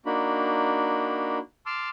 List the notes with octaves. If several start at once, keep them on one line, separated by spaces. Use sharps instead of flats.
A#3 D4 D#4 F#4 B5
A5 C6 D6 E6 F6